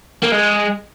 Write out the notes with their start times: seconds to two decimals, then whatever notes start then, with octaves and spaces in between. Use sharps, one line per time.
0.23 A#3
0.32 G#3